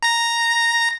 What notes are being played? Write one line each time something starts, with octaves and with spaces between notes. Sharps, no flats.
A#5 A#6